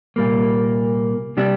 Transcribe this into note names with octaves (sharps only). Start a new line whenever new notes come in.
C2 A#2 G3 A#3
C3 G3 D4 G4